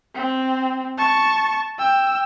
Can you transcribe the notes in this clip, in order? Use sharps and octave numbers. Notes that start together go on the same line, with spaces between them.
C4
A5 C#6
G5 E6